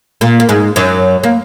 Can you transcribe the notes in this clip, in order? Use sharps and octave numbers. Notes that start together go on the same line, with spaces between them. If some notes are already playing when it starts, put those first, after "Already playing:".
A#2 A#3
A#3
G#2 G#3
F#2 F#3
A#3